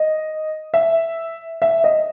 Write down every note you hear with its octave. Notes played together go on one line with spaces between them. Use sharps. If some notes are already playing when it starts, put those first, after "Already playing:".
Already playing: D#5
E5
E5
D#5